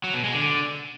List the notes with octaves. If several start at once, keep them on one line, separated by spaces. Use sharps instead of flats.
F#3
B2
G#3
D3